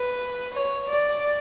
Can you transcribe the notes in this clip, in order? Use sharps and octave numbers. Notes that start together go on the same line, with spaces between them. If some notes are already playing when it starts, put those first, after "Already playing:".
Already playing: B4
C#5
D5